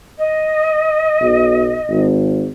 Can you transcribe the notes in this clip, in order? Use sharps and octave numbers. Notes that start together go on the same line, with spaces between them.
D#5
B1
G#1